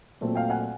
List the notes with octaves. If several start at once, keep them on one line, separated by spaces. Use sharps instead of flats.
A#2 F#3 A3 C4
F5 G5
F#5 G#5